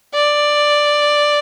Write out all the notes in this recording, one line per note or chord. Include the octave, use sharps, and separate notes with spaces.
D5